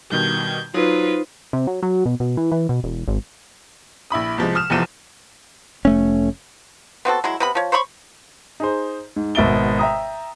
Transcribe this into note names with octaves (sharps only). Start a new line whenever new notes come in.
B2 D#3 G3 G6 G#6
F#3 D#4 F4 B4 C5
C3
F#3
F#3
B2
B2
E3
E3
B2
E1
G#1
A#1 E4 B5 D#6
C2 F3 G#3
D#6 F6 E7
F1 E2 E3 F3 D#7 E7
F1 A3 C#4
B3 C4 F#4 A4
F#3 G#3 E4
C3 B3 B5
F3 C#5
C5 C#5 B5 C#6
D#4 G#4 C5
G#2
G#1 B2 E5 A6 D7 G7
E5 G5 A#5 D#6